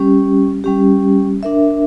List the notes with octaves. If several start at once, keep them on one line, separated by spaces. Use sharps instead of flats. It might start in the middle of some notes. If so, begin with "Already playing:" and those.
Already playing: G3 C#4 G4
G3 C#4 G4
D4 A#4 E5